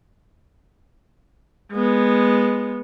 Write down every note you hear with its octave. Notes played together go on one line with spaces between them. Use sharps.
G#3 B3